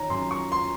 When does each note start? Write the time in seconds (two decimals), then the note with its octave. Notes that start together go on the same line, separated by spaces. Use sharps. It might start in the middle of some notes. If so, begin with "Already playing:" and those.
Already playing: D#3 C#5 A#5
0.10 F#2 C6
0.31 C#6
0.52 C6